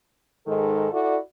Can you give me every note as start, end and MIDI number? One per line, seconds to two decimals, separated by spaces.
0.47 0.88 44
0.47 0.88 51
0.47 0.88 56
0.47 0.88 69
0.92 1.18 64
0.92 1.18 66
0.92 1.18 69
0.92 1.18 74